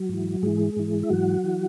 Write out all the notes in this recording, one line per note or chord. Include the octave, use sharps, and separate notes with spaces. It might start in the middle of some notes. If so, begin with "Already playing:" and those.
Already playing: F#3
G#2 E3
G#2 E3 G#3
G#2 E3
E4
G#2 E3 F#3 F#4
E3